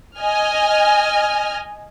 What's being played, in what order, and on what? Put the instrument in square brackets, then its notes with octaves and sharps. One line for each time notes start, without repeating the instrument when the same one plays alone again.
[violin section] D#5 G#5 F6